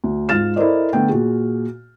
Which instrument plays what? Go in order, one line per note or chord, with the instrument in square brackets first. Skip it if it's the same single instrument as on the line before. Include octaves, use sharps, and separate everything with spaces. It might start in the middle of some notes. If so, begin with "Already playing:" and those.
[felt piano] D2
G#2 F4 F6 A6 E7
E4 A4 A#4 C5 D5 D#5
D3 A3 B3 G5
A#2 F#4 G#4